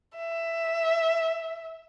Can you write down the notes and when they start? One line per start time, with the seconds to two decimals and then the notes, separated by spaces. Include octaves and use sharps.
0.17 E5